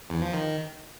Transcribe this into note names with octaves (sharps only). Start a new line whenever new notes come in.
E2
F3
D#3